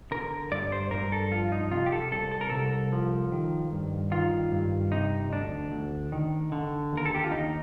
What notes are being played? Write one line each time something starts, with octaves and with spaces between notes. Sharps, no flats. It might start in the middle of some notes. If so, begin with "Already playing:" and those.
D3 A#4
G2 D5
C5
G2 A#4
A4
F3 F4
D#4
C3 F4
G4
A4
C2 A4
A4
A#4
C2 A4
F3
D#3
G2
D#3 F4
G2
C3 D#4
D2 D4
D2
D#3
D3
D#2 A#4
A4
G4
F4
D#2 D#4